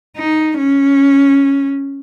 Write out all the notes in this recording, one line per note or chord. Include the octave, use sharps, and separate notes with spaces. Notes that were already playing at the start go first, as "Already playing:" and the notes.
D#4
C#4